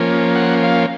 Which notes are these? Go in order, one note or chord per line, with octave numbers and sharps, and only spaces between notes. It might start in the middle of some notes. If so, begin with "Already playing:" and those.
Already playing: F3 A#3 C#4
F#5
F5